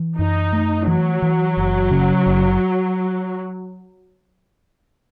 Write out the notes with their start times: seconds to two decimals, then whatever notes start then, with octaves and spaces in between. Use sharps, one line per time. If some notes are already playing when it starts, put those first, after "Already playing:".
Already playing: E3
0.18 F#2 D#4
0.53 A3
0.87 E3 F#3
1.22 E3
1.57 F#1
1.91 C#3
2.27 F#1